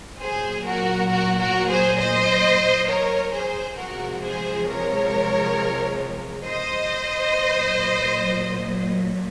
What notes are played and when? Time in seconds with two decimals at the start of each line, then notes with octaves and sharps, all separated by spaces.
0.20 A#2 F#3 G#4 C5
0.64 F#4 A#4
1.10 F#4 A#4
1.39 F#4 A#4
1.70 G#4 C5
1.99 C5 D#5
2.88 A#4 C#5
3.32 G#4 C5
3.77 C3 F3 G#3 F#4 A#4
4.22 G#4 C5
4.67 A#4 C#5
6.45 C5 D#5
7.35 A#2
7.40 F#3